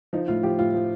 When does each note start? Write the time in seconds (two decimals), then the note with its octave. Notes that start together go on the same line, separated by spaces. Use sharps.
0.13 F3 D#4
0.28 A2 F4
0.43 F3 G4
0.59 A2 F4
0.74 F3